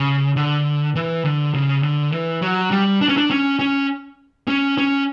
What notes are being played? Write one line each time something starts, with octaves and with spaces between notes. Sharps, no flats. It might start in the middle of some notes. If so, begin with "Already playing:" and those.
Already playing: C#3
D3
E3
D3
C#3
D3
E3
F#3
G3
D4
C#4
D4
C#4
C#4
C#4
C#4